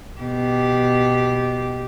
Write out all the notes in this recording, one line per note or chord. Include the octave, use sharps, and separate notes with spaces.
B2 G4